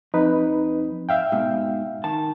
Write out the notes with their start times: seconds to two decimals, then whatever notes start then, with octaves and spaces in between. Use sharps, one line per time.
0.14 F2 D#4 B4
1.09 E5 F5 G5
1.32 G#2 B2
2.04 D#3 A5